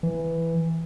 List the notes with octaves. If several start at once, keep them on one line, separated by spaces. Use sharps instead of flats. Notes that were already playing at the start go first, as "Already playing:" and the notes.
E3